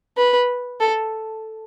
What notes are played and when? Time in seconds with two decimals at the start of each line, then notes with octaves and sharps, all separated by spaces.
0.17 B4
0.80 A4